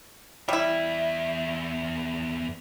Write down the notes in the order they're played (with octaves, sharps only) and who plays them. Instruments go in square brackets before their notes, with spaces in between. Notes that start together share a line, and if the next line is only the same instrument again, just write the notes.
[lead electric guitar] E2 E5 [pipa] G3 E4